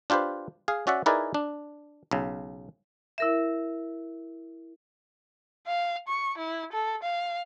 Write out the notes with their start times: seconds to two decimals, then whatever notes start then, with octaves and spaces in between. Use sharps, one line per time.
0.10 D4 F4 G4 B4 C5
0.68 G#4 F5
0.87 C#4 F#4 D5 E5 F#5
1.06 D#4 E4 G#4 A#4 B4 D5
1.34 D4
2.11 B1 C#3
3.18 E4 A#4 E5
5.68 F5
6.08 C#6
6.38 E4
6.73 A4
7.03 F5